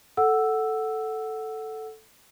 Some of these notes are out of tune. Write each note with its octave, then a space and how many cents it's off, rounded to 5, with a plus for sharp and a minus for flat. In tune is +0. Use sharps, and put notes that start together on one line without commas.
A4 +0 F#5 +0 E6 +0